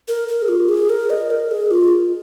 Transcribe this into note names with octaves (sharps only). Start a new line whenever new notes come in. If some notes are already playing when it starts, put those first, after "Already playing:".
A#4
A#4
G#4
F4
G#4
A#4
D#5
A#4
G#4
F4